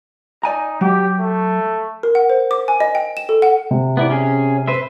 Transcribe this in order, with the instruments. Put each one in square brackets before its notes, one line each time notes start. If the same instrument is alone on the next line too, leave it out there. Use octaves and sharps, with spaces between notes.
[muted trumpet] D#4 [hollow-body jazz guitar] D5 G#5 A#5
[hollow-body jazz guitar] F#3 [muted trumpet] G4
[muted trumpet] A3
[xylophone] A#4
F#5
C5
D6
G#5
D#5
G5
E7
A4
F#5
[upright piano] C3
[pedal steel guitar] B3 E4 D5
C#4 G#4
B4 C5 E5